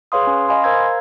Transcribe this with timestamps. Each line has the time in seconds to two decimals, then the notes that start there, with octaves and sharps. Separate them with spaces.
0.12 G#4 B4 C#5 F5 C6 D#6
0.27 C#4
0.48 D#5 F5 G#5 B5 C6 D#6
0.64 A#4 C5 F5 A#5 E6 G#6